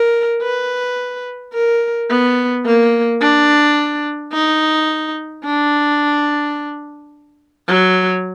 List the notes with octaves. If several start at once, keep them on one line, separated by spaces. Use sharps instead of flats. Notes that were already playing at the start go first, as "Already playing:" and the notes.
Already playing: A#4
B4
A#4
B3
A#3
D4
D#4
D4
F#3